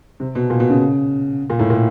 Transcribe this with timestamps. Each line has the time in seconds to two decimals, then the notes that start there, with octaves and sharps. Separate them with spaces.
0.20 C3
0.35 B2
0.50 A#2
0.60 B2
0.70 C#3
1.50 A#2
1.59 A2
1.70 A#2